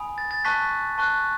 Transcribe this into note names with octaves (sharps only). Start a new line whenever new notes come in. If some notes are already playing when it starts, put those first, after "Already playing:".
Already playing: G#5 B5 D#6
A6
A6
A5 C#6 F#6 B6
A5 C#6 F#6